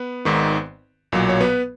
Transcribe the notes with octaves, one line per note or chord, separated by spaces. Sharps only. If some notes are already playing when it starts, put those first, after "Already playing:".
Already playing: B3 B4
G#1 G#2 D#3
B1 A#2 F#3
C#5
B3 B4